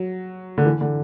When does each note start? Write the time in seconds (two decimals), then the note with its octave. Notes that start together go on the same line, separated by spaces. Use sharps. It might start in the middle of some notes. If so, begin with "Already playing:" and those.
Already playing: F#3
0.58 D3
0.66 E3
0.81 D3